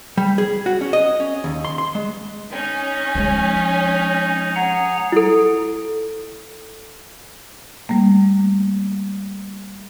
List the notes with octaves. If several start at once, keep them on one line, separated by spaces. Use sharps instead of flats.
G3
G#4
F#4
C#4
D#5
C#4
D#2
C6
C6
G#3
C#4 D#4
F3 G#3
G#4 F#5 A#5
E4 A4
G3 A3 A#3